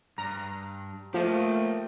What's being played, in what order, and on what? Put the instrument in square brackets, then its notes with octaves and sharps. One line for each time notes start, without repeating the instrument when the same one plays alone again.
[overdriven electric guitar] G2 [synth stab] A#5
[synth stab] F3 [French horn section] A3 A#3 [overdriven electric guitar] G4 D#5